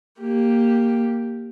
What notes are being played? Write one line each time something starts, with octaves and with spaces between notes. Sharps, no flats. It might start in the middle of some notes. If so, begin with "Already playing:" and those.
A#3 G4